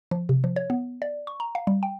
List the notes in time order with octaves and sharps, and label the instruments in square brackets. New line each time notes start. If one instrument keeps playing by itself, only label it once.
[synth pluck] F3
C3
F3
C#5
B3
D5
C#6
A#5
F5
G3
G5